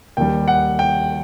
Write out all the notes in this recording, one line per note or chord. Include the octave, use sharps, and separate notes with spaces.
D#2 D#3 G3 G5
F#5
G5